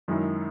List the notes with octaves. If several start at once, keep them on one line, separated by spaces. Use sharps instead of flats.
F#2 D#3 G#3 C#4 E4